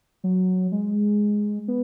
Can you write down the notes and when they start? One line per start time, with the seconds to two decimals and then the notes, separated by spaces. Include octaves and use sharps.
0.24 F#3
0.72 G#3
1.68 B3